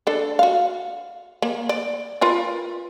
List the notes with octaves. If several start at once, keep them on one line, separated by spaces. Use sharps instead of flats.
D4 A4
F#4 F5
A#3
D5
F4 A#4 B4